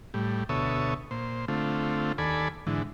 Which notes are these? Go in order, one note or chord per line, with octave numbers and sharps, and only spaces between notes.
A2 G3
D2 B2 A4 C#5 E5 D#6
A#2 C5
D3 A3 C4 F4
D#2 A4 D5 G#5 B5
G#2 D3 E3